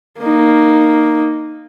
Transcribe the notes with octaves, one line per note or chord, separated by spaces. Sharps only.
A#3 D#4